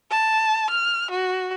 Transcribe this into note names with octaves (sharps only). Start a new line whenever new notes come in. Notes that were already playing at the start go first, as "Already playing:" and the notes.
A5
F6
F#4